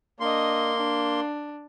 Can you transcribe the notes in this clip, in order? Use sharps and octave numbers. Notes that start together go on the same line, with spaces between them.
A#3 D4 D#5 C6
D4